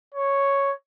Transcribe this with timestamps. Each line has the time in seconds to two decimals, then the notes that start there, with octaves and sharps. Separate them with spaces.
0.14 C#5